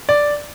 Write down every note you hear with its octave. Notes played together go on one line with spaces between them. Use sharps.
D5